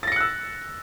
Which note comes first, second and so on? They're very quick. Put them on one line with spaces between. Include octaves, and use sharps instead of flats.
A6 A#6 C#7 F#6 E6